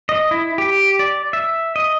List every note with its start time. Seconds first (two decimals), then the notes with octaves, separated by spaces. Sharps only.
0.09 D#5
0.31 E4
0.58 G4
0.99 D5
1.33 E5
1.76 D#5